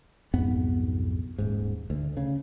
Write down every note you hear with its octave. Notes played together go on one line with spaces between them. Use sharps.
B1 F2 G#2 B3
D#1 G#2
D2
C#3